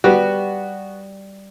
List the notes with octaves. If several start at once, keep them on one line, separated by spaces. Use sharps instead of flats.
G3 B3 F#4